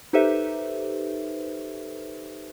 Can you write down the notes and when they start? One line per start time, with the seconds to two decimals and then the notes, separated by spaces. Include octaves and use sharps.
0.13 D#4 G4 A4 B4 C5 E5